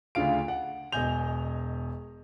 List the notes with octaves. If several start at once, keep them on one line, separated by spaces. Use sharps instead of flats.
D2 C#3 D4 F4 F5 D7
F#5
E1 B2 D#5 G#5 G6 F7